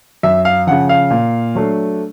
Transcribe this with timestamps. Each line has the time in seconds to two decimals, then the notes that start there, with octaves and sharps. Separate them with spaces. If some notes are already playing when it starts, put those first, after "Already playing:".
0.23 F#2 E5
0.45 F5
0.67 C#3 F3 F#5
0.89 F5
1.10 A#2
1.55 F#3 A3 D4